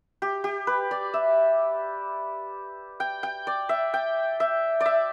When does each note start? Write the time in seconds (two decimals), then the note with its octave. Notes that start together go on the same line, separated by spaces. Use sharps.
0.22 G4
0.44 G4
0.67 B4
0.91 D5
1.14 E5
3.00 G5
3.23 G5
3.47 D5
3.69 E5
3.94 G5
4.40 E5
4.80 D5
4.86 E5